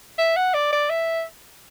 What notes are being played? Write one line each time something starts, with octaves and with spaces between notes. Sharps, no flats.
E5
F#5
D5
D5
E5